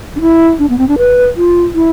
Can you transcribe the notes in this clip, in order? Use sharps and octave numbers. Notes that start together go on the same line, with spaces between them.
D4
E4
D4
B3
C4
D4
B4
F4
E4